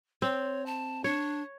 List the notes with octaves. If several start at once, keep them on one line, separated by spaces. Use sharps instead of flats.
C4 C#5
A5
D4 C#5